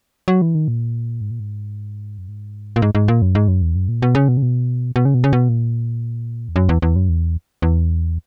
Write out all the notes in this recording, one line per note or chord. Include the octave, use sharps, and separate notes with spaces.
F#3
E3
D#3
A#2
G#2
A#2
G#2
F#2
G#2
A#2
G#2
G#2
A#2
F#2
G#2
F#2
E2
F#2
A#2
B2
C#3
B2
C#3
B2
B2
C#3
B2
C#3
B2
A#2
E2
F#2
E2
E2
F#2
E2
E2